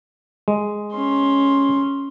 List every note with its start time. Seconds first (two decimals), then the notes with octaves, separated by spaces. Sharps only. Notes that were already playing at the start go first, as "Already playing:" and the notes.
0.48 G#3
0.94 C#4 C6